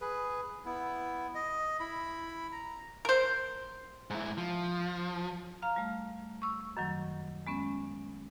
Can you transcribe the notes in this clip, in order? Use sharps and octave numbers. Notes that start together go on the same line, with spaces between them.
G#4 B4
B3 E4
D#5
E4 B5
A#5
A#4 C5
G#2 E4
F3
F5 A#5 F6
G3 A3
C#6 E6
F#2 D#3 F#3
G#3 B3 C#4